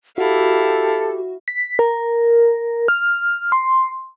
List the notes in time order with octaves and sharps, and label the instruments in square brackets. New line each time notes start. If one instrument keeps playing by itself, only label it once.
[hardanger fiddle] E4 F5 [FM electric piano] F#4 [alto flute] G4 [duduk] A4
[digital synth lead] B6
A#4
F6
C6